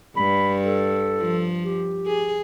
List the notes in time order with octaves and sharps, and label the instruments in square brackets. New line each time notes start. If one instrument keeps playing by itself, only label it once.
[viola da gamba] G2 [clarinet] B5
[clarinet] A4
[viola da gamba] F3
[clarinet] G4
[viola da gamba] G#4